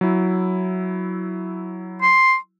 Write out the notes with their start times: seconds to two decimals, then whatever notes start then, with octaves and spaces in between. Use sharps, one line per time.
0.01 F#3 E4
2.02 C6